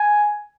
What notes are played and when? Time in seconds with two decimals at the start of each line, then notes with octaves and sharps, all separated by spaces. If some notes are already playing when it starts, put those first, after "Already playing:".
Already playing: G#5